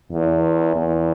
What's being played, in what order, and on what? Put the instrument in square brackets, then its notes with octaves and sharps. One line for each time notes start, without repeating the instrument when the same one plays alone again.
[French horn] E2
E2